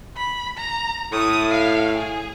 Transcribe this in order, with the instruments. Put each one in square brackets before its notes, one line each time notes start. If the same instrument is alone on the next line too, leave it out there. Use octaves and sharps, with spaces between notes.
[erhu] B5
A#5
[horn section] A2 [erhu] D#6
[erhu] F5
G#4